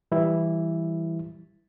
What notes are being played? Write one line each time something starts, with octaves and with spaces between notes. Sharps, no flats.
E3 G3 E4